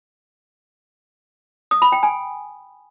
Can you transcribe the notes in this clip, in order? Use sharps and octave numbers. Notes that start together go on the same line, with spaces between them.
D#6
B5
G5
G#5